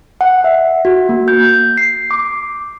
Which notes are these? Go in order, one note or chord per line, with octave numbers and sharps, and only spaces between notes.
F#5
E5
F#4
A#3
G6
C7
D6